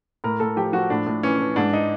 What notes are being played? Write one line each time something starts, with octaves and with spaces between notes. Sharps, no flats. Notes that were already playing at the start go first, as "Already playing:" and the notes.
A2 A#4
A2 A4
F3 G4
F3 F#4
A2 D4
A2
E3 C#4
E3
G#2 D4
D#4